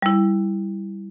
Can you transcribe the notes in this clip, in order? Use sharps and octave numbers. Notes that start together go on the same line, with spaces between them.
G3 E4